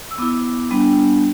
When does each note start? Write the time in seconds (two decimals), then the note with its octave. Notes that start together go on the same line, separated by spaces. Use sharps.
0.11 E6
0.18 B3 E4 D6
0.71 G3 B3 D4